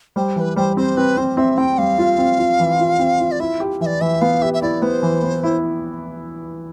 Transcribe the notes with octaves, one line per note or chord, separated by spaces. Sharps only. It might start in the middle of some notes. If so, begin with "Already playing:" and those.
G3 C5
E3 B4 C5
G3 C5
C4 C5
C4 B4
C4 C5
C4 E5
C4 G5
G3 F5
F4
C4
F4
E3
F4
C4
F4
D5
E4 E5
G4
E3 E5
D5
E3 E5
B3 F5
G4 E5
E5
E4 D5
B3 C5
E3
B3
E4